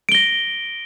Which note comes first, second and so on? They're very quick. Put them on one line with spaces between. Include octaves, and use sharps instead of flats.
D7 G7 A#6